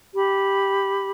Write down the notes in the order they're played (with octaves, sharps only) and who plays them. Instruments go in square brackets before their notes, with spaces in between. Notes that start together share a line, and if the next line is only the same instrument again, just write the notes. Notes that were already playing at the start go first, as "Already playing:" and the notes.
[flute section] G4 B5